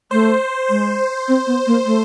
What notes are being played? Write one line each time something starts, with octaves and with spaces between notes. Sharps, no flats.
A3 C5
G#3 C5
C4
B3
A#3
A3